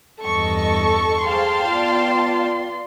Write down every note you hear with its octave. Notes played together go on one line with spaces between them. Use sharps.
E2 G2 A4 D#5 C#6
G#4 C5 F5 G5 A5 C6
B3 F4 D5